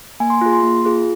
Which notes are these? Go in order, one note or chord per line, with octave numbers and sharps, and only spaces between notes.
A#3 G#5
C6
F4 G#4
C6
A#3
F4 G#4